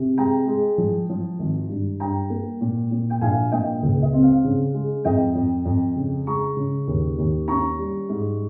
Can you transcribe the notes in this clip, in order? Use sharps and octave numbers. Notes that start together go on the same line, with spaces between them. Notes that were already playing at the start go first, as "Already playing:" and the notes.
Already playing: C3
G#3 G5 A#5
G#3
F3
F3
G#1
G2
G2 G5 A#5
A#3
A#2
A#2
G5
A#1 F5 G#5
A#2 D#5 G5
C#2
D#5
C4
F5
C#3
G#3
F2 D#5 G5
F2
F2
C#3
G#3 A#5 C#6
C#3
D#2
D#2
C#4 A#5 C#6
G3
G#2